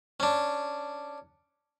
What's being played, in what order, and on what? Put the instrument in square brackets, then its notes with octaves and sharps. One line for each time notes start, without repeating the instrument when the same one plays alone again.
[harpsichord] C#4 D4